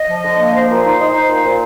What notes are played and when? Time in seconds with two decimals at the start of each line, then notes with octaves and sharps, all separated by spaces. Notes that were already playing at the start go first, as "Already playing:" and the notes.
Already playing: D#5
0.09 F3
0.24 D3
0.38 A#3
0.53 F3 C5
0.69 A#2
0.83 D#4
0.98 D#4
1.13 D#4
1.29 A#2
1.44 A#2